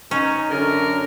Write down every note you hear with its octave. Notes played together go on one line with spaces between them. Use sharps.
C#4 D#4
F#2 D3 A#4